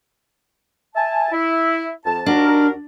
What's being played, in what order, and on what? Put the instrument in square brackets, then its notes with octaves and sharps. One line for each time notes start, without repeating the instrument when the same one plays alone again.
[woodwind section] E5 G#5 A5
E4
F2 A5
[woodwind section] D#2 F#4 A#4 [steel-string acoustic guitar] D4